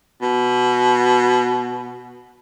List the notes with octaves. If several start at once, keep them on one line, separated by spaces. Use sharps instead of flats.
B2